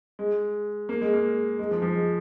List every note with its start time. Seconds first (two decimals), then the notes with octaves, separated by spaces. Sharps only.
0.19 G#3
0.89 A#3
1.01 G#3
1.13 A#3
1.59 G#3
1.71 F3
1.82 F3
1.94 G#3